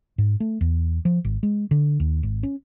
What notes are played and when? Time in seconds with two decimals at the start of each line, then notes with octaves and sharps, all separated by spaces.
0.18 G#2
0.40 A3
0.61 E2
1.05 F3
1.25 G#1
1.43 G#3
1.71 D3
2.00 D#2
2.23 G#1
2.43 C#4